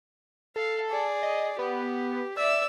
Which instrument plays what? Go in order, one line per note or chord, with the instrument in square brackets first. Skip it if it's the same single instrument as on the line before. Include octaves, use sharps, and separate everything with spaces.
[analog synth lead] A4 [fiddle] F5
[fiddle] G#4 D5
[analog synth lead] D#5
[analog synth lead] B3 [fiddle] G4
[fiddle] D5 E6 [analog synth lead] E5